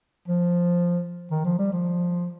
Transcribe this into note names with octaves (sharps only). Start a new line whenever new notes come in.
F3
D#3
F3
G3
F3